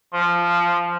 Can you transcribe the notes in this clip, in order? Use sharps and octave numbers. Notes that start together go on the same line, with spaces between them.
F3